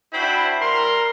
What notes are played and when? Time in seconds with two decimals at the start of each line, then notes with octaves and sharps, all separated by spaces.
0.13 D4 E4 F#4 C5 G5 B5
0.61 G3 A#4 A#5 C6